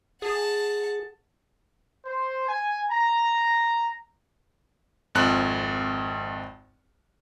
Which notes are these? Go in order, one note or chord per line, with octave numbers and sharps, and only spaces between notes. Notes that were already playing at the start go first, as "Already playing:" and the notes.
G#4 F#5 A5
C5
G#5
A#5
G#1 F2 F#6